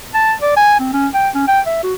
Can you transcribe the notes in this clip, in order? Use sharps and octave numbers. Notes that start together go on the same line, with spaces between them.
A5
D5
G#5
C4
C#4
G5
C#4
G5
E5
F#4